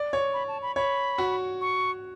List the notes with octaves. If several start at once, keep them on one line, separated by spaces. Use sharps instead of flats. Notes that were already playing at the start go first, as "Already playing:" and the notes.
Already playing: D5
C#5
B5
A5
B5
C#5 B5
F#4
C#6